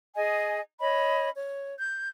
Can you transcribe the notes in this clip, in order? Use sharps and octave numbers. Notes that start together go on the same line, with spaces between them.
G#4 D#5 G#5
C#5 D#5 B5
C#5
G6